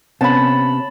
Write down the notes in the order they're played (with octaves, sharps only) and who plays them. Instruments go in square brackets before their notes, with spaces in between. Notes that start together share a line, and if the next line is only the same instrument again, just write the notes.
[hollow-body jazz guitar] C3 B3 C#4 [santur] A5 B5